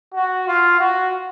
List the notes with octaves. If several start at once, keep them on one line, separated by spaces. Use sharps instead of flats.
F#4
F4
F#4